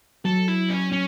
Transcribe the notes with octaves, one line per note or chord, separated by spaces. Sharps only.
F#3 A4
E4
C#4
C#4